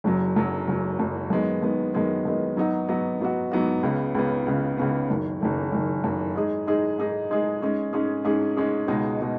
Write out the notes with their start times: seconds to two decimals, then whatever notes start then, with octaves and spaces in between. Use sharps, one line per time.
0.04 F#1 F#2 F#3
0.36 F#1 F#2 F#3
0.67 F#1 F#2 F#3
0.99 F#1 F#2 F#3
1.30 F#2 D#3 G#3 B3
1.62 F#2 D#3 G#3 B3
1.94 F#2 D#3 G#3 B3
2.25 F#2 D#3 G#3 B3
2.57 G#2 F#3 B3 D#4 F#4
2.89 G#2 F#3 B3 D#4 F#4
3.20 G#2 F#3 B3 D#4 F#4
3.51 G#2 F#3 B3 D#4 F#4
3.83 C#2 C#3 B3
4.15 C#2 C#3 B3
4.46 C#2 C#3 B3
4.77 C#2 C#3 B3
5.09 F#1 F#2 D#3
5.41 F#1 F#2 D#3
5.72 F#1 F#2 D#3
6.04 F#1 F#2 D#3
6.35 G#2 G#3 D#4 G#4
6.67 G#2 G#3 D#4 G#4
6.98 G#2 G#3 D#4 G#4
7.30 G#2 G#3 D#4 G#4
7.61 G#2 G#3 C#4 G#4
7.93 G#2 G#3 C#4 G#4
8.25 G#2 G#3 C#4 G#4
8.57 G#2 G#3 C#4 G#4
8.88 C#2 B2 G#3 D#4
9.21 B2 G#3